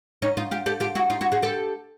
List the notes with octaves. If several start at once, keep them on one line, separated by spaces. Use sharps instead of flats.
C#4 D#4
D#4 F4
F4 G4
G4 A4
F4 G4
E4 F#4
D#4 F4
E4 F#4
F#4 G#4
G4 A4